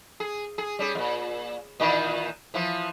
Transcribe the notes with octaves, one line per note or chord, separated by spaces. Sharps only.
G#4
G#4
G3 C#4 G#4
E2 A#2
A#2 D#3 E3
E3 F3